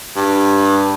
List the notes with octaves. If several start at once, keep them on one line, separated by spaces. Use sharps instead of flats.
G2